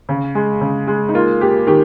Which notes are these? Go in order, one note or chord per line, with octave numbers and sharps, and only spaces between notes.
C#3
G#3
C#3
G#3
D#4
A#3 F4
A#3 G4
D#3 G4